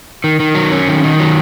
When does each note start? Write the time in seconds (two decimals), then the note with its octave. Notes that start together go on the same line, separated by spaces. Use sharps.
0.24 D#3
0.40 D#3
0.55 F#3
0.72 C#4
0.88 D#3
1.04 D#3
1.19 F#3